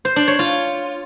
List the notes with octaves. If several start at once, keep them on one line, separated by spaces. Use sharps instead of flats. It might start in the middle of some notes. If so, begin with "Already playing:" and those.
C5
D4
C#5
F4